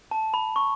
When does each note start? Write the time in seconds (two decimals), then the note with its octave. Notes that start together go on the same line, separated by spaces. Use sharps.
0.11 A5
0.34 B5
0.56 C#6